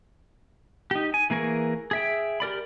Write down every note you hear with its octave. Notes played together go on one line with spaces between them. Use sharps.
D#4 G4
G#5
E3 A#3 G#4 A#4 C#6
G#4 E5 G5
G4 A#4 D5 B5